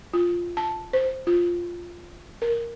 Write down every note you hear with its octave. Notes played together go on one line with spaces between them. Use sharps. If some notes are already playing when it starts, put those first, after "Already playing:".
F4
A5
C5
F4
A#4